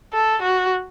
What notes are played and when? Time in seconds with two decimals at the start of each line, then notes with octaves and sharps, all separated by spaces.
0.13 A4
0.42 F#4